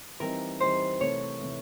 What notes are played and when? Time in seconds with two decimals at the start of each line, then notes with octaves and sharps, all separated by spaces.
0.20 E3 G3 C4 D#4 A#4
0.60 E3 G3 C4 D#4 C5
1.01 C3 E3 A3 C#5
1.41 C3 E3 A3